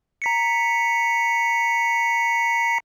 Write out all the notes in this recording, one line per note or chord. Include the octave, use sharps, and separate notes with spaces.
A#5 B6 C#7